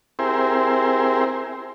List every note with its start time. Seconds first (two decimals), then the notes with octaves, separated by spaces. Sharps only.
0.19 C4 E4 G4 G#4 A#4 C5